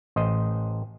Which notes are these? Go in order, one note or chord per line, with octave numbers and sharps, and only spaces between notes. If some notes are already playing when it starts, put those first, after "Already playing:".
A1 C5 D#5